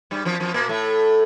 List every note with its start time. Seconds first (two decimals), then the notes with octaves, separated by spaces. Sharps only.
0.11 G2 G3
0.25 F2 F3
0.40 F2 F3
0.54 A#2 A#3
0.69 A2 A3